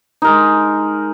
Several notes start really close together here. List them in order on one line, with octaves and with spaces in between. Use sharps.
D#4 A#4 G#3